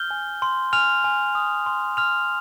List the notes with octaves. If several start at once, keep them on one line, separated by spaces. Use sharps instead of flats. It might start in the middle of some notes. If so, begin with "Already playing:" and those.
Already playing: F6 G6 G7
G#5
C6
G#5 F6 F7
G#5
D#6
C6
C6 F6 F7